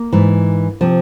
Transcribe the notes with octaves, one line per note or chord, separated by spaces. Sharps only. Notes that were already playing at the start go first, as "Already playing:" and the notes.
Already playing: A#3
G#2 E3
C3 F3